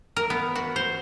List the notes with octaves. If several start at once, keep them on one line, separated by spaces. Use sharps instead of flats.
A#4
B3
F#4
C5